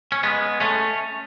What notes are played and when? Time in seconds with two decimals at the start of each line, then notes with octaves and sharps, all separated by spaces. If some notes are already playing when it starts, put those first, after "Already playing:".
0.12 C#4
0.23 G#3 B3
0.60 A3 C#4